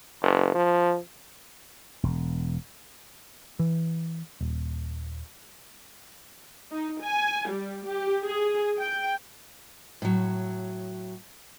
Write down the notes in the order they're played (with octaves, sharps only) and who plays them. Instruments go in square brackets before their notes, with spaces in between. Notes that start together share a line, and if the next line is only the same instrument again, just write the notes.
[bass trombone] F#1
F3
[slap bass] E1
[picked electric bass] E3
D#1
[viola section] D#4
G#5
G3
G4
G#4
G5
[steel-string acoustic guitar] A2 F#3